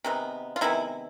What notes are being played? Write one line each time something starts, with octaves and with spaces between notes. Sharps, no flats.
C3 D#3 G#3 B3
F4
C3 D#3 G#3 B3 E4